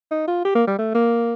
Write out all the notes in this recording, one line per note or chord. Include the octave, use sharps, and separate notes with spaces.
D#4
F4
G4
A#3
G3
A3
A#3